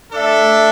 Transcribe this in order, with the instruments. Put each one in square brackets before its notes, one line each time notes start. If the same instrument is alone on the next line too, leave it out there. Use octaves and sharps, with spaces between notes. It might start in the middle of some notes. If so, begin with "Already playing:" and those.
[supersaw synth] A3 [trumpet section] D4 A4 E5